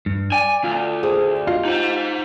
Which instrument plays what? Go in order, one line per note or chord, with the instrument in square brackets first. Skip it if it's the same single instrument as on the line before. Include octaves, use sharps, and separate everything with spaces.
[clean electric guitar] G2
[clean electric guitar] D5 [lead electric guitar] G#5
[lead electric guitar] D2 [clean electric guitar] F4
[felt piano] G#4 C5
[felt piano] F4 [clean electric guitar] G4 D#5 F5
[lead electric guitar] D#4 C5